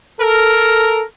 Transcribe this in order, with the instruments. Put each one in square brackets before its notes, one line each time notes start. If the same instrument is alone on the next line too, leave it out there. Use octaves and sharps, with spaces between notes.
[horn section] A4 A#4